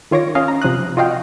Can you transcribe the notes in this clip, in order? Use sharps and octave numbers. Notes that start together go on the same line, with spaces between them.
D#3 F4 C#5 D6 A#6
C#4 D#5 F5
A#5
C3 F3 F5 D#6 F#6
F4 F#4 D#5 F5 G5